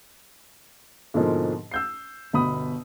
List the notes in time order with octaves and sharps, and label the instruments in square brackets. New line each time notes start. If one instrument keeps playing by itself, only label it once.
[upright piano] G#2 B2 D3 F3 G#3 A#3
E6 G6 C7
G1 B2 B5 D#6